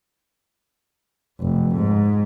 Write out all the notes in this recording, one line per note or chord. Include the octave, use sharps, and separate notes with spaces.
F1
G#2